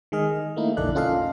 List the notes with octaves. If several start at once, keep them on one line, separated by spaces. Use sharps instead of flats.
D#3 G#3 G#4 D#5 F6
A3 A#3 D#4 E4
B1 F2 D3 A4 D5 F#6
C#4 F4 A4 D#5 F5